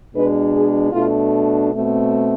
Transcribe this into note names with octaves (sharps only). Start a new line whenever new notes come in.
B2 G#3 D4 B4
G#4
B2 A3 D4 F4
B2 A3 C4